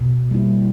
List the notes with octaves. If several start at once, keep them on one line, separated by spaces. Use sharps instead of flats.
B2
G3 A#3 E4